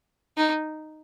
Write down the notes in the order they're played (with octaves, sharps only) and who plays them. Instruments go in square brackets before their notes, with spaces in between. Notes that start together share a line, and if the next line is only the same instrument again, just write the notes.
[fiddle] D#4